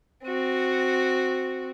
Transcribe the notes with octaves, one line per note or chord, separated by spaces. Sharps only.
C4 F#4